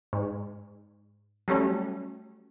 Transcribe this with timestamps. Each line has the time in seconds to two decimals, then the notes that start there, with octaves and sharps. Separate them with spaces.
0.13 G#2
1.48 F#3 G3 A3 C#4